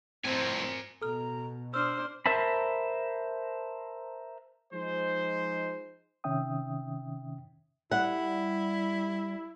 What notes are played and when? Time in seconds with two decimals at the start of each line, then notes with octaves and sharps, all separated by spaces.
0.25 F2 A2 C4 A#4 C5 G#5
1.02 B2 A4 A#5 F6
1.74 D4 C5 E6 F6
2.26 A#4 C5 E5 A5 B5
4.74 F3 G#3 D#4 C5
6.24 C3 D#3 C#4 E5 G5 D#6
7.91 G3 E4 F#5